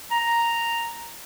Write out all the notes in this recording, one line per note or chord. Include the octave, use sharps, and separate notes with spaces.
A#5